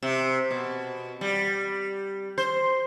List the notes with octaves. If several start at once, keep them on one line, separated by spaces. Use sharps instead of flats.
C3
B2
G3
C5